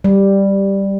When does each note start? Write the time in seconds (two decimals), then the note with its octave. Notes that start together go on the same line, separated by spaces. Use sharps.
0.04 G3